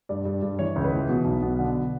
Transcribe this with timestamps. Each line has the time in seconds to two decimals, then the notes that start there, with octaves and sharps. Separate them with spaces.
0.09 G2 D5
0.25 G2
0.43 G2
0.59 E3 C#5
0.76 C#2
0.84 B4
0.92 E3
1.09 B2
1.25 B1
1.42 B2
1.59 D3